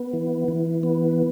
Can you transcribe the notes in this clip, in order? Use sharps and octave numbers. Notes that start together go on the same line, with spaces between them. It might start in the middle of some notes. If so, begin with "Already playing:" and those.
Already playing: B3
E3
E3
B3